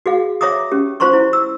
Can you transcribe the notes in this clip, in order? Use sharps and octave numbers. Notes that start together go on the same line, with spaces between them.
F#4 G#4 F5
C#5 E5 A#5 D6 D#6
C#4 G4
F4 C5 A#5 C6 C#6
E4
E6